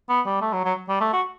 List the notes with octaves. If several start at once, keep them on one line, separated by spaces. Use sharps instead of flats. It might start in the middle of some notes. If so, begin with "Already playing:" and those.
B3
G3
A3
F#3
F#3
G3
A3
F#4